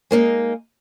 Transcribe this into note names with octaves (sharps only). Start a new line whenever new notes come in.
G#3 A#3 D4 D#4